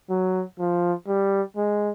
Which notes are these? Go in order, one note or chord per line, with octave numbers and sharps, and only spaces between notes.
F#3
F3
G3
G#3